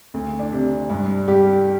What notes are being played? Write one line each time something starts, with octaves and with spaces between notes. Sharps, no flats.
D2
D4
C3
G2 D4
G3 G4